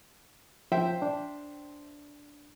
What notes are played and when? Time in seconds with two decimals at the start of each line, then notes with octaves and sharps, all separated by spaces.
0.72 F3 C5 E5 G5
1.02 D4